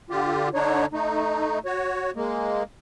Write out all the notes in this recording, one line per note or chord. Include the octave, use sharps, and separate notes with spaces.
D3 F4 G4
D3 D4 D#4 C#5
A3 D#4
F#4 C#5
G#3 A#3